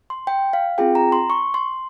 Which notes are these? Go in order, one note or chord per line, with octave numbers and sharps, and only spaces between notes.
C6
G5
F5
C4 F4 G#4 G5
A#5
C6
C#6
C6